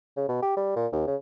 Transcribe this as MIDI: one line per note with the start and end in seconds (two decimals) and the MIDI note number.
0.16 0.27 49
0.28 0.39 47
0.42 0.56 67
0.56 0.71 55
0.76 0.87 46
0.92 1.04 39
1.07 1.16 49